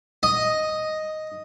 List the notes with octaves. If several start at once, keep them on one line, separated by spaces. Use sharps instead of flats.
D#5